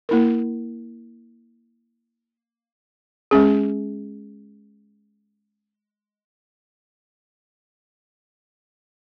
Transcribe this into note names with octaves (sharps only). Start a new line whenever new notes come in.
A#3 E4 A#4
G#3 C#4 G#4